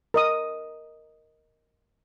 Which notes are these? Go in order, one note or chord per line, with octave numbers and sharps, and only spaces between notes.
A#4 D#5 D#6